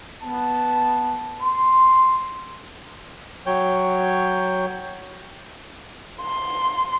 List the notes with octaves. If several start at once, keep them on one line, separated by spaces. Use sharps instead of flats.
B3 A5
C6
F#3 C#5 G5 G6
C6